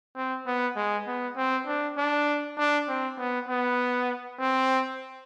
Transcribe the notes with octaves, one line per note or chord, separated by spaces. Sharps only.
C4
B3
G#3
B3
C4
D4
D4
D4
C4
B3
B3
C4